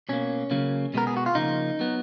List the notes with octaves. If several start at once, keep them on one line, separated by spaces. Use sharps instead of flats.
B2 A#3 C#4
C#3 F#3 A#3
B2 G#3 B3 A#4
G#4
F#4
F4
C#3 F3 A#3 D#4
F#3 B3